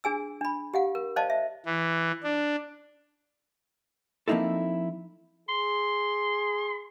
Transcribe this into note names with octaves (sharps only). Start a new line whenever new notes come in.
D4 G#4 G#5 E6
D4 B5
G4 F5 F#5
A#4
C5 D5 D#5 F5 A5
E5
E3
D4
F3 A#3 C4 D#4 E4 A4
G#4 C6